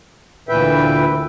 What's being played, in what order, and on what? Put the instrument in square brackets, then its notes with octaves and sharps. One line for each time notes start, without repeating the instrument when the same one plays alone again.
[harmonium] D2 A#2 E3 B4 E5 G5